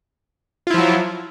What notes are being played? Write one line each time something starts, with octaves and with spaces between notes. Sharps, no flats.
F3 F#3 E4 F4